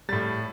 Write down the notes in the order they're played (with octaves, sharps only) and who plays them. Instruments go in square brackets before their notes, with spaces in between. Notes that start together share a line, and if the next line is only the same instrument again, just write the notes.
[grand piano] A2 G3 A6